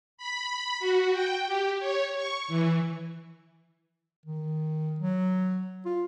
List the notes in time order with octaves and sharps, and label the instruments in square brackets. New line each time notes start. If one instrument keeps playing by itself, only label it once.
[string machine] B5
F#4
G5
G4
C#5
C#6
E3
[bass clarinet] D#3
F#3
F4